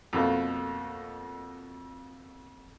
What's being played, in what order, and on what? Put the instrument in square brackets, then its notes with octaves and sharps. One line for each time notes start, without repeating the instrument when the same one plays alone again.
[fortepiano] F2 B2 A3 A#3